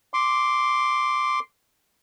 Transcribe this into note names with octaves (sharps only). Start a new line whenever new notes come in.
C6 D6